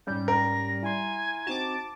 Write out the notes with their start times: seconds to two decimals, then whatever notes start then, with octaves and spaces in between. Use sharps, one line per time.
0.07 G#2 G3 C#4 G6
0.28 A#4 A#6
0.83 E4 G#5 C6
1.47 C4 D#4 F#4 A5 D6